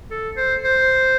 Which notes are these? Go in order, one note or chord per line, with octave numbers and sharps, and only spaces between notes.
A4
C5
C5